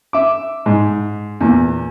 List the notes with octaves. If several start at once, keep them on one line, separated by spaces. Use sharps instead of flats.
E5 D6
G#2
E2 A#2